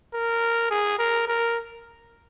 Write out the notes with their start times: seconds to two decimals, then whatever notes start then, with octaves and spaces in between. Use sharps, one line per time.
0.14 A#4
0.71 G#4
0.99 A#4
1.28 A#4